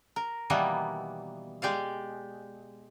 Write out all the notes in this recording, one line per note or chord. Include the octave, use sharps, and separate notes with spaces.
A#4
B2 D#3 E3 G3 A#3 B3
G#3 G4 D5 F5